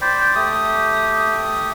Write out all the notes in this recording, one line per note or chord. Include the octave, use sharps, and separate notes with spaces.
C5 D5 G5 B5
A3 G4 D#6